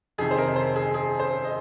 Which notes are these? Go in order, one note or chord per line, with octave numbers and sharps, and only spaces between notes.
F2 C3 D#3 G#4
C5
A#4
C5
G#4
G#4
C5
D#5